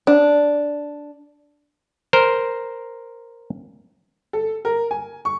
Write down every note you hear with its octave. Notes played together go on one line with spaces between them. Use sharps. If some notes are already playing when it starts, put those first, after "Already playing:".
D4
A#4 C5
A4
A#4
G#5
C#6